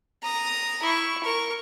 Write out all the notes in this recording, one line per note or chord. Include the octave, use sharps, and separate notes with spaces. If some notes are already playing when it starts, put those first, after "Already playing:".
A#5 D#6
E4 C#6
A#4 C#6